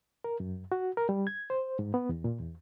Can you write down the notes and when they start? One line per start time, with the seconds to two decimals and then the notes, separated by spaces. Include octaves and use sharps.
0.24 A#4
0.40 F#2
0.72 F#4
0.97 A#4
1.09 G3
1.27 G#6
1.50 C5
1.79 G#2
1.94 B3
2.09 E2
2.24 A#2
2.40 E2